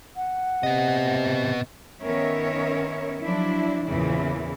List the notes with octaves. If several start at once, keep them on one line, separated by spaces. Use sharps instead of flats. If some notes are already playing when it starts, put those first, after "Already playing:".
F#5
C3 B3 D#5
D#3 B3 C#4 A#4 C#5 E5
F3 F#3 D4 E4
E2 A#2 C#3 E3 E4